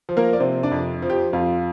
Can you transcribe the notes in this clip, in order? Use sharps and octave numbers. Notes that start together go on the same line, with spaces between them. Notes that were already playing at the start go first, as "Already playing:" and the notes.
F3
A#3 A#4
D5
C3 C4 C5
D4 D5
F2
F3
G4
F2 F4